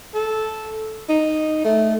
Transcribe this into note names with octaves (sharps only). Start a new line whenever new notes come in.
A4
D#4
A3